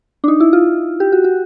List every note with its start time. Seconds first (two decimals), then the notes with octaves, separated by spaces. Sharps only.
0.24 D4
0.28 D#4
0.40 E4
0.53 F4
1.00 G4
1.12 F#4
1.24 F#4